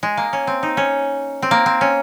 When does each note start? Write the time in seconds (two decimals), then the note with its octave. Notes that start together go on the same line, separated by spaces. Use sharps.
0.03 G#3
0.17 A#3
0.33 C#4
0.47 C4
0.63 D#4
0.77 C#4
1.42 C4
1.51 A#3
1.66 C4
1.81 C#4